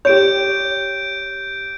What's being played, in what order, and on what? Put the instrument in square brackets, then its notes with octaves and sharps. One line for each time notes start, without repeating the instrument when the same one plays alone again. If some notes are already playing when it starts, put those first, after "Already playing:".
[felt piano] G4 C#5 [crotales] G6 D7